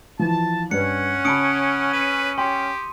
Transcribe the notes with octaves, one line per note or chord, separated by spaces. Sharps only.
E3 F3 A5
G2 C#4 B4 F#5 C#7
C#3 A5 B5 D#6 C#7 D7
B4 D#7
G4 G5 C6